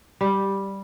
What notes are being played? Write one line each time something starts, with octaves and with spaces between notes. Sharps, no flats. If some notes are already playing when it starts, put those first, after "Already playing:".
G3